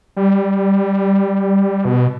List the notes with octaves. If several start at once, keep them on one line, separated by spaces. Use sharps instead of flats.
G3
B2